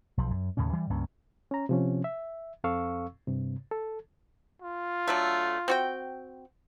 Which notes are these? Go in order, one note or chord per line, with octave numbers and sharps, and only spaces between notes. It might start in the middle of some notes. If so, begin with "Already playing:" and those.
B1 F3
F#2
D#2 A2 C#3 C#4
E3 G3
C#2 G2 A#3 C#4
C#4 A#5
C3 F3 C#4
E5
F2 C4 A4 F5 C#6 E6
G2 C3
A4
F4
D3 F#3 A3
C4 F#4 G5